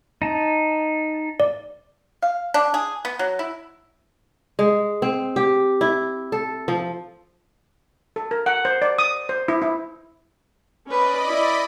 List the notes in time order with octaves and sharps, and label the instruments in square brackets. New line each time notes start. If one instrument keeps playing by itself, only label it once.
[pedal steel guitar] D#4 A5
[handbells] D5
[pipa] F5
D4
G#4
B3
F#3
E4
[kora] G#3
C4
G4
E4
A4
F3
[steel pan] A4
A#4
F#5
C5
D5
D#6
C5
E4
E4
[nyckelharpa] C#4 B4 [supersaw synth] D5 D#5 B5
[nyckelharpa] E4